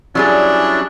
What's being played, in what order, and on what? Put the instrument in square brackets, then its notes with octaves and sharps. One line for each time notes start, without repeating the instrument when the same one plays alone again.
[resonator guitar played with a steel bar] F#3 G3 G#4 [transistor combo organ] C#4 E4 [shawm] D4